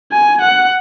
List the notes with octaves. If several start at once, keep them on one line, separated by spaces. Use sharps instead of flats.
G#5
F#5